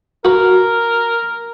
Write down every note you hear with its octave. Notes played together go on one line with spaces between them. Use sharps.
F#4 A#4 B4